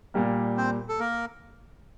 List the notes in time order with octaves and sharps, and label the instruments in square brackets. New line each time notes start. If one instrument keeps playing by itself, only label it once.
[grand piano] A#2 G3 A#3
[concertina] C4 C5
A4
A#3 A#4